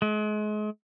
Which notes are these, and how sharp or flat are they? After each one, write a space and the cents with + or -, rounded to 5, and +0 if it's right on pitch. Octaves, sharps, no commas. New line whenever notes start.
G#3 +35